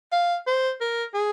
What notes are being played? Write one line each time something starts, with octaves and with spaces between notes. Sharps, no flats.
F5
C5
A#4
G#4